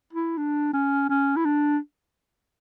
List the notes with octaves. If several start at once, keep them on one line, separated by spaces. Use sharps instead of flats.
E4
D4
C#4
C#4
E4
D4